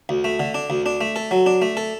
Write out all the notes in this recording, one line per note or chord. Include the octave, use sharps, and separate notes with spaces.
D2
A3
D3
D4
D2
D4
A3
A4
F#3
D4
A3
A4